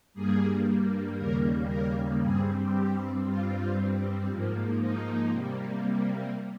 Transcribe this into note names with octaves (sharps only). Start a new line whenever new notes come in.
G2 G3 A#3 G#4
D#2 C#3 G3 A#3 A#4
A#4
G2 G3 C4 G#4
G4
G2 G3 C4 F4
G#2 F3 A#3
D#4
C3 G3 A#3